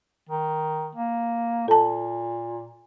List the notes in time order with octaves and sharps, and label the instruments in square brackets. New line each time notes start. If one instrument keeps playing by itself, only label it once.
[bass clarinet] D#3
A#3
[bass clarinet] A#2 [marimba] A4 A5